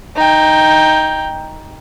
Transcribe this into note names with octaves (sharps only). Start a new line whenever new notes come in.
D#4 G5